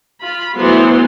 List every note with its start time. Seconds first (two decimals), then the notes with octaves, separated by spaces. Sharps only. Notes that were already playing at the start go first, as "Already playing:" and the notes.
0.22 F4 B5
0.58 E3 F#3 A3 B3 C5 C6